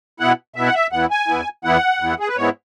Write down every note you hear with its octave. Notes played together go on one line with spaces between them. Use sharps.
B2 B3 E4 F#5
B2 B3 E4 E5
F#5
E5
E2 E3 B3 E4 F#5
G#5
E2 E3 B3 E4
E2 E3 B3 E4 F#5
E2 E3 B3 E4
G#4
B4
G#2 G#3 B3 E4 C#5